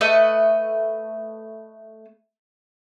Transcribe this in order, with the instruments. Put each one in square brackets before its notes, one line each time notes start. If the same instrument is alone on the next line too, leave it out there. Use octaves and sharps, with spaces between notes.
[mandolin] A3 B4 D#5